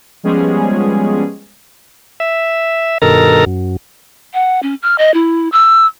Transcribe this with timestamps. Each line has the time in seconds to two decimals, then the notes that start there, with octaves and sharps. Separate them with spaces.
0.23 F3 G3 G#3 B3 C#4 G#4
2.20 E5
3.02 G2 B2 D#3 A4 A#4 A#5
3.46 F#2
4.34 F#5
4.63 C#4
4.82 F6
4.98 D#5
5.14 E4
5.52 E6